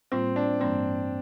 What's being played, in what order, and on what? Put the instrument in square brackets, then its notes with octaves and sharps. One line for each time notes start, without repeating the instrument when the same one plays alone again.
[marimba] A2 G3 A#3 F4 [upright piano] C4
[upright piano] D4
[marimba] G2 E3 G3 A#3 [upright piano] C4